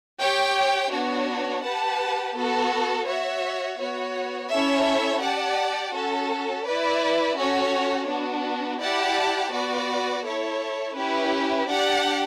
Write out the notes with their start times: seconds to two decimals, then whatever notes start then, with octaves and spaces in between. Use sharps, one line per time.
0.19 G4 C#5 G5
0.91 B3 D4 F#4 C#5
1.63 G4 B4 F#5 A5
2.35 B3 F#4 A4
3.07 F#4 C#5 E5
3.78 B3 F#4 C#5
4.50 C#4 E4 A4 C#5 E5
5.21 G4 D5 F#5 A5
5.93 C#4 F#4 A4
6.65 E4 B4 D5
7.37 C#4 F#4 A4 C#5
8.08 B3 D4 F#4
8.80 E4 G4 D5 F#5 A5
9.52 B3 F#4 B4 D5
10.24 E4 A4 C#5
10.95 C#4 E4 G4 B4
11.67 D4 G4 D5 F#5